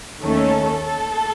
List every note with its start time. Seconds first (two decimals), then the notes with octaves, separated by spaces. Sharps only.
0.22 D#2 D#3 A3 C#4 A4
0.86 A4